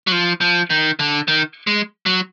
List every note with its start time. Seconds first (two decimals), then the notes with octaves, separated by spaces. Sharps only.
0.07 F#3
0.12 F3
0.41 F3
0.70 D#3
0.99 D3
1.28 D#3
1.67 G#3
2.06 F#3